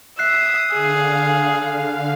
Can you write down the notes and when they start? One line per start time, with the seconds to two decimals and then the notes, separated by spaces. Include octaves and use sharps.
0.19 E5 D#6 F#6 C7
0.73 D3 G#4 F5